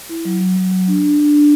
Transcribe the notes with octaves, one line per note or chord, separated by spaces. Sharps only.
E4
F#3
F#3
F#3
F#3
D4
D4
D4
D4